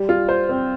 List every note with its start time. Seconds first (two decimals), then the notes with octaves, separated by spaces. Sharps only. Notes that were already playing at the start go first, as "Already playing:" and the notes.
Already playing: G3
0.09 F4
0.29 C5
0.49 C4